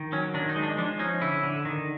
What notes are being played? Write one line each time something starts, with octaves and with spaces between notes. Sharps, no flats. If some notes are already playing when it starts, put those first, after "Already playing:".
Already playing: D#3
F#3 C#4
D#3 D4
D#4
G#3
D4
F3 D4
C#4 D#4
D3 E4
D3
D#3